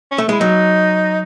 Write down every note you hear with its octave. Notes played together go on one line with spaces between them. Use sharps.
C#4
A3
G#3 E4
F#3 D#4